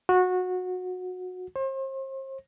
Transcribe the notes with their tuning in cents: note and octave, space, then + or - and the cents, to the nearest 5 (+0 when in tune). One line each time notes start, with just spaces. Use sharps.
F#4 -20
C5 +40